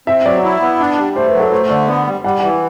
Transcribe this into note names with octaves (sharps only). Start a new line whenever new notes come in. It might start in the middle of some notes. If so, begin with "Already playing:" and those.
C4 E5
F#3 D5
E4
B3
D4
G3
A3 C5
B4
F#3
A4
A3 C5
D3 D5
B3 D5
G3
G3 F#5
E3 F#5